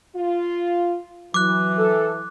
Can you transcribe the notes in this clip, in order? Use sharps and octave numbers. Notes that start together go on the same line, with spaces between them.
F4
E3 F#3 D6 F#6
A4